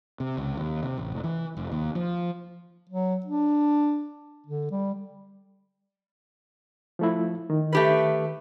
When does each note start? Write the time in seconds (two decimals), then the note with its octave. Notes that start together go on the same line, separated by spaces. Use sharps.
0.20 C3
0.37 C#2
0.57 D#2
0.83 C3
0.98 A1
1.12 F1
1.24 E3
1.57 F1
1.71 D#2
1.95 F3
2.89 F#3
3.26 D4
4.47 D3
4.71 G3
6.99 F3 A3 E4
7.50 D#3
7.73 A3 G4 B4